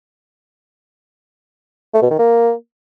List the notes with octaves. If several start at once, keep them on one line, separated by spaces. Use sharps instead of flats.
A3
B2
D#3
A#3